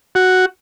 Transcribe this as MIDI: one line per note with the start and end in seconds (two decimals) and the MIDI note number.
0.15 0.45 66